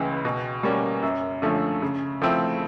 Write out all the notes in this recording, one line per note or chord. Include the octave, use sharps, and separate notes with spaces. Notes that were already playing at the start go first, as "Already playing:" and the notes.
Already playing: C#2 C#3 E3
B2
G3 A#3 C#4
F#2
D3 F3 A3 C#4
C#3
F3 A3 C4 E4